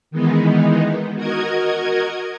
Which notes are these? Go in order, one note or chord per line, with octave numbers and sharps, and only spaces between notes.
D#3 E3 G#3 B3 D#4
F#4 A#4 D#5 G#6